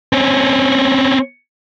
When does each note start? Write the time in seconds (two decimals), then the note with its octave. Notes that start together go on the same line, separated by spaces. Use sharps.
0.13 C4 C#4